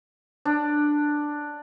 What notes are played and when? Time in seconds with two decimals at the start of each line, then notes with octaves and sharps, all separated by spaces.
0.45 D4